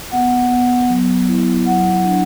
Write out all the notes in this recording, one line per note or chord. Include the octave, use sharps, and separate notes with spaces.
B3 F#5
B3
F#3
E4
F#3 F#5
D4